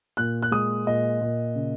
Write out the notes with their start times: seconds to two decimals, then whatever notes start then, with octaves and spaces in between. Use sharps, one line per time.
0.17 A#2 F#6
0.42 F#6
0.52 G#3 D#6
0.87 A#2 D#5
1.21 A#2
1.55 C#3